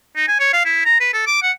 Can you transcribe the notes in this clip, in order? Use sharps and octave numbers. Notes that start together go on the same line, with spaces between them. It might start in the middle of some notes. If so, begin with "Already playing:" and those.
D#4
G#5
C#5
F5
E4
A#5
B4
A4
D6
F#5